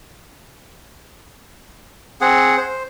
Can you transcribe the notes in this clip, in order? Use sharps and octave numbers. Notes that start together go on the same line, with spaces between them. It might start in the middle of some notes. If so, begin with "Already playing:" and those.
C4 G#4 F#5
C5